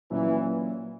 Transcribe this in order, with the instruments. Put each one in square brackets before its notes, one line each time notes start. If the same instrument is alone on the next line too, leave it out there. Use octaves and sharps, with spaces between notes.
[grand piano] A#2 F#3 C#4 E4 [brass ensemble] E3